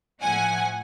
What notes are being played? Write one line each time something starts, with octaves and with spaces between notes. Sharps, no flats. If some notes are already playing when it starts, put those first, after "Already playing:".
A2 F3 A3 F#5 G#5